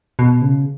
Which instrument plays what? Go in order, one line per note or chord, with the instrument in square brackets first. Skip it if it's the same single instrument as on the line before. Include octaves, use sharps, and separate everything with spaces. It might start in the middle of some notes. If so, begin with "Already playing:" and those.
[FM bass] B2
C#3